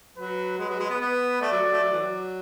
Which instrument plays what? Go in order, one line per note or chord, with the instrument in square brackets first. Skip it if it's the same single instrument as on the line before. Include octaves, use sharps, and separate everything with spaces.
[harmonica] F#3 [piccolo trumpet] B4
[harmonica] G#3 [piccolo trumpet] B4
[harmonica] F#3
G#3
B3
[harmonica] B3 [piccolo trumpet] B4
[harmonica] A3 [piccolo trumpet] D5
[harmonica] F#3
F#3
A3
F#3
E3
F#3